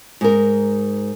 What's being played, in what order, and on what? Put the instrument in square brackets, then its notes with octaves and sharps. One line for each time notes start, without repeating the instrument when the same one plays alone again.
[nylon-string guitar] G#2 A#4